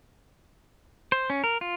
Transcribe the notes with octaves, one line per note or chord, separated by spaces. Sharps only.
C5
C#4
A#4
F4